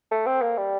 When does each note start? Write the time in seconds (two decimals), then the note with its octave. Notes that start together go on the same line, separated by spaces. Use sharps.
0.11 A3
0.27 C4
0.42 A#3
0.58 G3